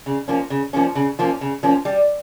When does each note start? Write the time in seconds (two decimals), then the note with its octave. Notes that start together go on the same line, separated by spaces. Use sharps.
0.06 C#3
0.28 F3 A#3 C#4
0.50 C#3
0.73 F3 A#3 C#4
0.95 C#3
1.19 F3 A#3 C#4
1.41 C#3
1.63 F3 A#3 C#4
1.85 G3